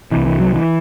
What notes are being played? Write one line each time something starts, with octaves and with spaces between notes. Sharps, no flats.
C2 C3 E3
E3
F#3
E3